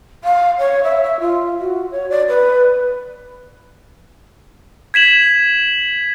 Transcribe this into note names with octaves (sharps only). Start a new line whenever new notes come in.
F5
C#5
E5
E5
F4
F#4
C#5
D5
B4
G#6 B6 E7 F#7